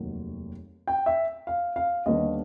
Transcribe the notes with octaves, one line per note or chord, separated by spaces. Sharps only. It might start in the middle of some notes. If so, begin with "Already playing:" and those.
Already playing: F1 D#2 D#3 F#3
G5
E5
F5
F5
D#2 D3 G3 B3 D4 D#5